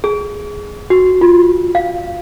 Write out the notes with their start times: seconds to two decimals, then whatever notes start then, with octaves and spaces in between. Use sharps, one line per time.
0.04 G#4
0.90 F#4
1.21 F4
1.75 F5